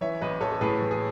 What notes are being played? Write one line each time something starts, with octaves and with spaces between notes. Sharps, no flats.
E3 C#5 E5
A1 B4 D#5
A1 A4 C#5
A4
A2 G#4 B4
E3
G#4